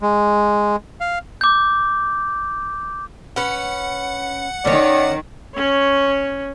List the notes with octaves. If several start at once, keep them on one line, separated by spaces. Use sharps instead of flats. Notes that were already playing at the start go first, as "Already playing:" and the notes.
G#3
F5
D6 G6
C#4 B4 F#5
D#3 C#4 C#5 D5
C#4 C#5